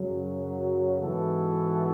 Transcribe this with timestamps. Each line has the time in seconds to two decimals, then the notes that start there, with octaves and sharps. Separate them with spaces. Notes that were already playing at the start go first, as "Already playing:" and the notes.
Already playing: F#2 C#3 F#3
1.02 G#2 E3 B3 F#4 A4